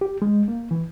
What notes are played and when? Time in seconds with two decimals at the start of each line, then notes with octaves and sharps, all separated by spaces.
0.01 G4
0.22 G#3
0.48 A#3
0.71 E3